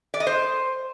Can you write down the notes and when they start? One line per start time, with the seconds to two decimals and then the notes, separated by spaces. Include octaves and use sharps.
0.14 D5
0.20 D#5
0.27 C5